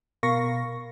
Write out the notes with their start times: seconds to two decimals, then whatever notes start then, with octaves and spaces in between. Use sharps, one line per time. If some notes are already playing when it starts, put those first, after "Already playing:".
0.23 B2 A#4 F5 C#6 A#6